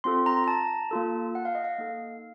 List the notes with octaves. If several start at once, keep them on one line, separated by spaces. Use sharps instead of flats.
C4 F4 A4 C6
A#5
A#5
A5
A#3 F4 A4
F#5
F5
D#5
F5
A#3 D#4 A4